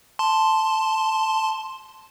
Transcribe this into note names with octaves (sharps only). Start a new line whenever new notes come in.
A5 C6